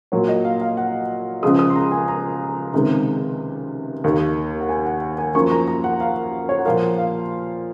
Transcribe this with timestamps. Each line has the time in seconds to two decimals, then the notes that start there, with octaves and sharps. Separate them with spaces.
0.12 A#2 F#3 A#3 C#5
0.28 D#5
0.45 F5
0.61 F5
0.77 F#5
1.43 C#2 C#3 F3 G#3 D#6
1.59 D#6
1.70 C6
1.75 A#5
1.92 G#5
2.08 A#5
2.74 C#2 C3 D#3 G#3
4.04 D#2 D#3 A#3
4.60 F#5
4.69 G#5
4.85 F#5
5.02 F#5
5.18 G#5
5.34 F#2 F3 A#3 C#6
5.51 A#5
5.68 A#5
5.84 F#5
6.00 F5
6.49 C#5
6.59 F#5
6.65 A#2 F3 A#3 F5
6.98 F5